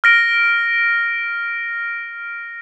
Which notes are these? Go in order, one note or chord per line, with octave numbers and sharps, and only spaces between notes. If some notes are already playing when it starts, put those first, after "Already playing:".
F6 A#6 D7